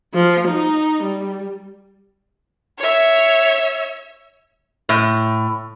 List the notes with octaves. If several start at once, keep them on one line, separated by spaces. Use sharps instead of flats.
F3
D#4
G3
C#5 E5
A2